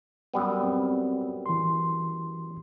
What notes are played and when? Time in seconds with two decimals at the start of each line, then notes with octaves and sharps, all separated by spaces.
0.34 F#2 G3 B3
0.63 C4
1.46 E3 C6